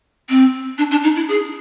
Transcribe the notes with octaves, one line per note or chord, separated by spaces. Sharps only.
C4
D4
D4
D#4
E4
G#4